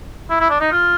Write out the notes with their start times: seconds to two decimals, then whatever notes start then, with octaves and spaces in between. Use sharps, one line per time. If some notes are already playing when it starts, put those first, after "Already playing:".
0.30 E4
0.40 E4
0.50 D4
0.61 D#4
0.71 F4